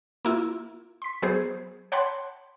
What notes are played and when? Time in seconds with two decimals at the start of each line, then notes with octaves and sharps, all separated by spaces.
0.25 A#3 E4 F4
1.02 C6 B6
1.22 F#3 B3 G#4 C5
1.92 C#5 F#5 G5 A5 B5 C6